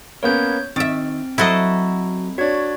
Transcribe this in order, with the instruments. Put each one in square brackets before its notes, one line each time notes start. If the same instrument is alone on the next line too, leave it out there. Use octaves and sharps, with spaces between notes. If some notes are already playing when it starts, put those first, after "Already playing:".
[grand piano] A#3 B3 C#4 [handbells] C#5 G6
[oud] D#3 E5 [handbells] C4 [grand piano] A6 D7
[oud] F#3 F#4 C5 [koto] E4 A4 D#5
[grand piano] D4 C#5 [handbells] F#4 G#6